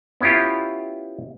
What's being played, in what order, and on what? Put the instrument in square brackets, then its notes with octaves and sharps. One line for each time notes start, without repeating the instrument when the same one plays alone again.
[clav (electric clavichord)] B3 C#4 E4 F4 G4